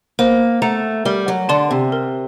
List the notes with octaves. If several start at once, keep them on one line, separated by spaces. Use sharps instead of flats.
A#3 C5
A3 F#5 A#5
G3 A#4
F#3
D3 D5 A5 C6
C3
A#4